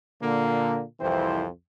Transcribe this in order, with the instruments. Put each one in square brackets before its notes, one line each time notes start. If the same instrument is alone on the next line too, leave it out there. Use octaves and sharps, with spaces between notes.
[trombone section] A#2 D3 A#3
C2 F2 E3 C4 E4 C5